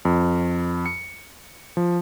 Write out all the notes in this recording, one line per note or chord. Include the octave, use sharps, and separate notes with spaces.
F2
C#7
F3